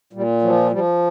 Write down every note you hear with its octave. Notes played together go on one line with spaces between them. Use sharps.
A#2 G3
F3 F#3
F3 G3